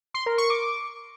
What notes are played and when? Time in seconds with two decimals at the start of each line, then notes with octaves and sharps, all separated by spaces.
0.14 C6
0.26 A#4
0.38 C#6
0.50 D6